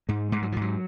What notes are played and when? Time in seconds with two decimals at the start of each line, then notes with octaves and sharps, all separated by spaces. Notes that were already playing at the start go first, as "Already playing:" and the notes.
0.09 G#2 G#3
0.32 G#2 G#3
0.42 F#3
0.52 F3
0.56 G#2
0.62 F#3